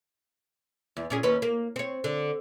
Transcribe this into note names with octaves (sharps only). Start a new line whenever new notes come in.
E2
A#2 C#4 G#4
D#2 C#4 B4
A#3
C4 C#5
D3